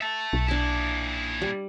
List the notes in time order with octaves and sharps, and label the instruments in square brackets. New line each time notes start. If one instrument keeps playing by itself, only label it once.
[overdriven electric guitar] E5 A5
[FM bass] B1
[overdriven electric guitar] A#2 E4 [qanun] D4 A5
[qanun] G3